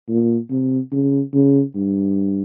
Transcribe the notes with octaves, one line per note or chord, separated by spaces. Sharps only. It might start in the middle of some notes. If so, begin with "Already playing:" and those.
A#2
C3
C#3
C#3
G2